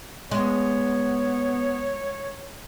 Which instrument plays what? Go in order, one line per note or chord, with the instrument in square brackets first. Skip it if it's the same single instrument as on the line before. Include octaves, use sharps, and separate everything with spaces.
[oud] G#3 [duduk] B3 [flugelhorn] C#5